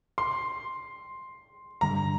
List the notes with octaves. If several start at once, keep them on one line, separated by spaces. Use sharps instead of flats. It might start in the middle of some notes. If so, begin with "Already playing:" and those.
C6
G2 D3 G3 A#5